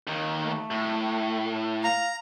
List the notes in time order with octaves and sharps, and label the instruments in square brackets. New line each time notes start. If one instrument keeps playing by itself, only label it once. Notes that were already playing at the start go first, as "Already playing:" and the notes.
[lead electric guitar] D#2 D#3
[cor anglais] A3
[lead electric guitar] A2
[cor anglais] F5 [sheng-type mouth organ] A#5